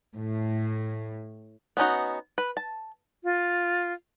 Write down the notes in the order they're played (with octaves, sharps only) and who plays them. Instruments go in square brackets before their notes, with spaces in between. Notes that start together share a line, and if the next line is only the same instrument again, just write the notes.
[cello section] A2
[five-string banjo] B3 C#4 D#4 F#4
B4
A5
[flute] F4